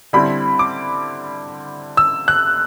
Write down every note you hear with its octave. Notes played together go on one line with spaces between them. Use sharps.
D3 G3 C4 E4 B5
D6
E6
F#6